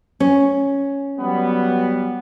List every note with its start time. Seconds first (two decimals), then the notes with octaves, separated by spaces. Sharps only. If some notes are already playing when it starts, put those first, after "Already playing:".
0.20 C#4
1.18 F#3 G3 B3